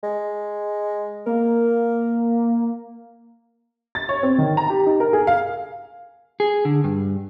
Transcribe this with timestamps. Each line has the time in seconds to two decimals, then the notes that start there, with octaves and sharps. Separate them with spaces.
0.03 G#3
1.27 A#3 A#4
3.95 A6
4.09 C#5
4.23 C4
4.38 D#3
4.57 A#5
4.70 G4
4.86 D#4
5.00 A#4
5.13 G#4
5.27 F5
6.40 G#4
6.65 D3
6.84 G2